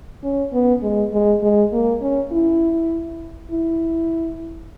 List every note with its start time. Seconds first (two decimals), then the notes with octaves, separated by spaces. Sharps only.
0.24 C#4
0.53 B3
0.83 G#3
1.13 G#3
1.43 G#3
1.73 A#3
2.02 C#4
2.32 E4
3.51 E4